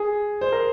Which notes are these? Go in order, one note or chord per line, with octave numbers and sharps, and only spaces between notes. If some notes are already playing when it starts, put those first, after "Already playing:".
Already playing: G#4
C5
A#4